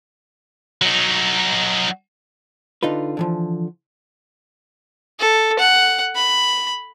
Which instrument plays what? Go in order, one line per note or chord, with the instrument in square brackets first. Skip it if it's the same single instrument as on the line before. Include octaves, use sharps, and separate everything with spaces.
[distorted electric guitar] F#3 D#4
[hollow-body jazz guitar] D3 D#4 F4 B4
D3 E3 F3
[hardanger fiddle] A4
F#5
B5